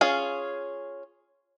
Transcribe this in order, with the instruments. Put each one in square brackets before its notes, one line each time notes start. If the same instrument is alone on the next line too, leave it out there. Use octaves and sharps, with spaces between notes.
[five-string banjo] C#4 F4 G#4